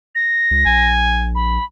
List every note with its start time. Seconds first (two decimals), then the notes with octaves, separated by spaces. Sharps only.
0.15 A#6
0.51 C#2
0.66 A#1 G#5
1.35 B5